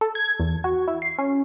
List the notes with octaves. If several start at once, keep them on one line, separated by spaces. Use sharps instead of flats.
A4
G#6
E2
F#4
E4
C7
C#4